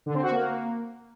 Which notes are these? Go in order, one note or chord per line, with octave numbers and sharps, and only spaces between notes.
D3
C4
F#4
A#3